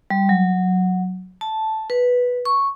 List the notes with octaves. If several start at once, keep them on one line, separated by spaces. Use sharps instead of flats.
G3
F#3
A5
B4
C#6